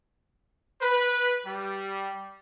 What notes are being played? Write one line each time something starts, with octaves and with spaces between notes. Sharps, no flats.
B4
G3